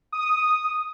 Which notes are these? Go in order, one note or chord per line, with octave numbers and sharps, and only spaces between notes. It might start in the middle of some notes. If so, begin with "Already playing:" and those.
D#6